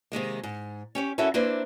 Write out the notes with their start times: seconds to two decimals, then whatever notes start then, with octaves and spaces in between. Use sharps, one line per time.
0.12 C3 D#3 G#3 A#3
0.43 G#2
0.95 C#4 G4 C#5
1.18 C#4 E4 F#4 A4 A#4 E5
1.34 A#3 C4 D4 E4 B4 C5